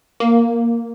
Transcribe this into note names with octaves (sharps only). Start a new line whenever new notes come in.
A#3